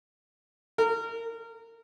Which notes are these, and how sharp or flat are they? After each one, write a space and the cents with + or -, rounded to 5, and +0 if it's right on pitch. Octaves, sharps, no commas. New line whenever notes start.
A#4 -25